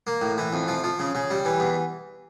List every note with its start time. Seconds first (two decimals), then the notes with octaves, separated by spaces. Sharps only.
0.07 A#3
0.21 A2
0.38 E3
0.53 F2
0.68 F3
0.84 F3
0.99 C#3
1.15 C#3
1.30 G3
1.45 E3
1.60 E2